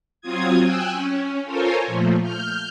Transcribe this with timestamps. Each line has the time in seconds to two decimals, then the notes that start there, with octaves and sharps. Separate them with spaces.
0.21 F#3 C4 F4 D#6 G#6
0.61 G5 G#5 E6 F#6
0.92 C#4
1.45 F4 A4 A#4 C5 C#5 G#5
1.87 A#2 F3 A3
2.21 F6 G6